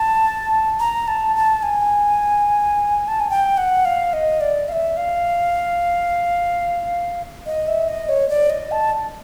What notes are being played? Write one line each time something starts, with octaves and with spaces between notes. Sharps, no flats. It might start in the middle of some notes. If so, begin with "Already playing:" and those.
Already playing: A5
A#5
A5
A5
G#5
A5
G#5
G5
F#5
F5
D#5
D5
F5
E5
F5
D#5
E5
D#5
C#5
D5
D#5
A5